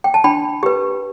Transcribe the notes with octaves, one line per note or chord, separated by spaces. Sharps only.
G5
A5
D4 G5 B5
G4 B4